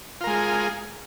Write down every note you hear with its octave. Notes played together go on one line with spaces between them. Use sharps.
G#3 F4 G#4 A#4